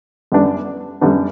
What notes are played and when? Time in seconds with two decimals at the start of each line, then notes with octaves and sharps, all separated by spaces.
0.32 F#2 D3 G3 B3 D4
1.01 F#2 D3 G3 B3 D4